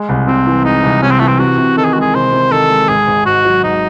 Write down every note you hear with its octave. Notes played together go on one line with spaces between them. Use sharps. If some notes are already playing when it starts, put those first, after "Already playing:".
Already playing: G#3
C2
C3 C4
E3
G#3 D#4
C2
C3 C#4
C4
E3 A3
C4
C3 F#4
C3
D#3 A4
G#4
G#3 F#4
G#4
C3 C5
C3
D#3 A4
G#3
G#1 G#4
G#1
G#2 F#4
F#3
G#1 D#4